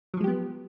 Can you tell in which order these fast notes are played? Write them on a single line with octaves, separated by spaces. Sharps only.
F#3 F3 G#3 G4 B3